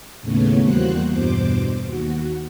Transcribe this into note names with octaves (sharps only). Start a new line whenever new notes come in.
D#2 A2 C#3 A3 B3 C#5
E2 G3 A#3 F#4 C5 F#6
E2 G2 B2 C5 D6
D#2 F#4